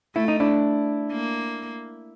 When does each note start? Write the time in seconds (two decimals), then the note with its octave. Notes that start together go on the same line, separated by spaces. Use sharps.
0.15 A3 E4
0.28 D#4
0.40 D4 E4
1.11 A#3